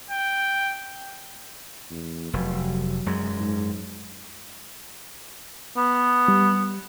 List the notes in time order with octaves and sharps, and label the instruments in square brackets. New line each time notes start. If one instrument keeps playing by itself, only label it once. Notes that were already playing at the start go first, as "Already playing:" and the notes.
[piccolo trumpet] G5
[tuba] E2
[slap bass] F1 [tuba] F#3
[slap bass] F#2 G#3
[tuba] G#2
[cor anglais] B3
[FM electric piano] G3